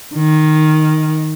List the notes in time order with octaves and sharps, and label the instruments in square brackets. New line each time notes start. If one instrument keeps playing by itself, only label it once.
[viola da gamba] D#3